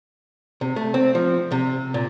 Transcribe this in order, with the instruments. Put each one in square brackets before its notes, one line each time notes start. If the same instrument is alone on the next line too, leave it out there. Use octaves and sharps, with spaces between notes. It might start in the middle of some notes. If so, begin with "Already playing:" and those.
[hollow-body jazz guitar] C3
A3
C4
F3
C3
A#2